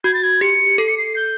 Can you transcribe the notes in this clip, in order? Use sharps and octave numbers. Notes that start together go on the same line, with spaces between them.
F#4 G#6
A6
G#6
G4 C#7
A4 C7
C#7
C7
G6